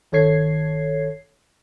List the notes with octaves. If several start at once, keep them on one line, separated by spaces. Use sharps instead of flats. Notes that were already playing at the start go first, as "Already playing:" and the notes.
G1 D#3 A4 C#5 G#6 C7